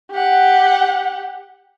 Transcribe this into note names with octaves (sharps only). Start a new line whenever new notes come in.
G4 F#5